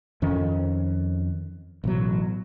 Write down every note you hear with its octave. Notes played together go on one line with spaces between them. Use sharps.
F2 D#3 C#4
A1 B2 F#3